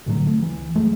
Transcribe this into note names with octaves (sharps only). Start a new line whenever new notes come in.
B1 A2 D3 F#3
C2 A3
C#2 E3
F#2 F#3 G#3 A3